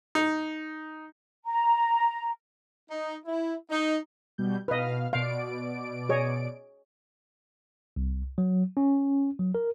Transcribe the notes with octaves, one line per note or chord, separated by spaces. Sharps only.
D#4
A#5
D#4
E4
D#4
B2 G3 G6
B2 B4 D#5 F5 F6
B2 D5 F5 D7
G#4 C#5 D#5
C2
F#3
C#4
F#3
A#4